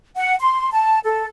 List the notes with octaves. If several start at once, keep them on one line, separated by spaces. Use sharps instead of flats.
F#5
C6
A5
A4